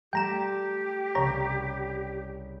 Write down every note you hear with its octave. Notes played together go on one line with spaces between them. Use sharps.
G3 A3 G4 G5 A#5 C6 E7
C2 C#3 C#5 A#5